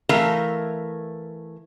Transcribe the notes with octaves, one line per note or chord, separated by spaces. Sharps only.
E3 A3 A#4 E5 F5 A#5